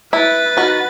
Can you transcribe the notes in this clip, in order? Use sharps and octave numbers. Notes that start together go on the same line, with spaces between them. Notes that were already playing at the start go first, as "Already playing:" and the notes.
E4 B4 A6
D#3 F#4